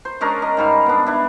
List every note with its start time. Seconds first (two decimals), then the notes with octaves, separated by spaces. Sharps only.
0.05 C5
0.21 G#3 C#4 D4 A#4
0.42 A#4 D#5
0.57 G#2 G3 F5
0.86 B3 D4
1.06 D4 E4